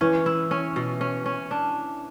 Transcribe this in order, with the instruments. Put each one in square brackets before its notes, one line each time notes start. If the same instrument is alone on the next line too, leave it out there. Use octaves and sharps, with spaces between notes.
[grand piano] E3 [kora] C#4
[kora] E4
C#4
B2
C#4
C#4
D4